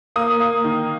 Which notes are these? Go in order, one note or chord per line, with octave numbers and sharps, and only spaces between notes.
A#3 D#6
A#3
D#3